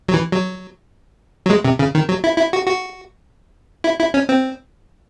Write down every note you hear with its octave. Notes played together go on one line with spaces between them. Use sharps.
F#3
E3
F#3
F#3
G#3
C3
C#3
D#3
F#3
E4
E4
F#4
F#4
E4
E4
C#4
C4